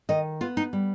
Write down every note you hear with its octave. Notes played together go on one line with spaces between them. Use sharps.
D#3 D#5
B3 F4
D#4
G3